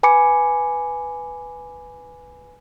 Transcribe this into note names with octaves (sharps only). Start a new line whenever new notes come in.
B4 G#5 B5 D6 C#7